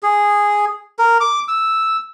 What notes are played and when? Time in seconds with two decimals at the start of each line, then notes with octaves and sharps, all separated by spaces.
0.03 G#4
0.99 A#4
1.20 D6
1.48 E6